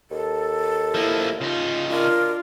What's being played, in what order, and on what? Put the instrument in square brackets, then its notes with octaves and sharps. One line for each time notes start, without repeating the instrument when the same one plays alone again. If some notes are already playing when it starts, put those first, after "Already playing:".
[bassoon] D#2 [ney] A4
[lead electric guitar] F3 A#3 [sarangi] E4
[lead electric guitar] C#3 D#4 [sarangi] F4
[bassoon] D4 [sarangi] F4 [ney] A#4